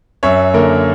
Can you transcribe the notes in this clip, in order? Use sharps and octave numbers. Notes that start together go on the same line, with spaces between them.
F#2 C#5 E5
D3 A#3 A#4